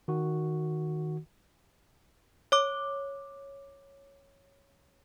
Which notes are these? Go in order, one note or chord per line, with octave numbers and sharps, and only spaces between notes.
D#3 F#4
C#5 D6